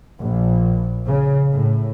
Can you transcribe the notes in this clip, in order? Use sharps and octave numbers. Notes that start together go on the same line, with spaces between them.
A#1
C#3
A2